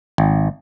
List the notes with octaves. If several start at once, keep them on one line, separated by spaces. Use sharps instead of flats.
G#1